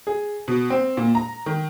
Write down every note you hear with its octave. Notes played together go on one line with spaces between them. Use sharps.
G#4
B2
C4
A#2
A#5
D#3